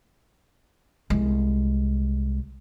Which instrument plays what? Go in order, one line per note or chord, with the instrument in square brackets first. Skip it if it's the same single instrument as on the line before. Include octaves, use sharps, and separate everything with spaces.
[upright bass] C2 G#3